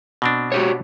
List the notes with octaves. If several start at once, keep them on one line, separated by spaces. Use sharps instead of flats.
B2 C4 D4
F#4 G4 C#5